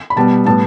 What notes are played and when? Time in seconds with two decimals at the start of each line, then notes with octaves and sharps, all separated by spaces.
0.10 B5
0.16 B2 G3 B3 A5
0.46 A2 G3 B3 A5